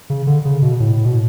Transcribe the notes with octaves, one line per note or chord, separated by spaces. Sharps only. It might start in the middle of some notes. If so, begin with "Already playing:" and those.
C#3
D3
C#3
B2
A2
B2